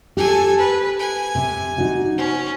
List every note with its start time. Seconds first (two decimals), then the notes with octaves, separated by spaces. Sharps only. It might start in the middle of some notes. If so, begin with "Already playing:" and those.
0.17 G4 A4 G#5
0.57 B4
0.99 G#5
1.35 C3
1.78 D#4 F#4
2.18 C#4